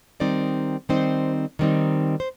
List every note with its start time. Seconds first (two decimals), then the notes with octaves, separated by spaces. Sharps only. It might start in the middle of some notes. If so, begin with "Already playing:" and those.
0.20 D#3 G3 C4 D#4 D5
0.89 D#3 G3 C4 D#4 C5
1.59 D#3 G3 C4 D#4
2.20 C5